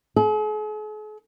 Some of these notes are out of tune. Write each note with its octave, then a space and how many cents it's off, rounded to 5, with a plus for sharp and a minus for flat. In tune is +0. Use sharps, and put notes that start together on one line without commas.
G#4 +45